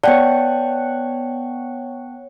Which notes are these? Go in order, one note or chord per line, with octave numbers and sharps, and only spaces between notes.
B3 C#5 D5 F#5 G5 A5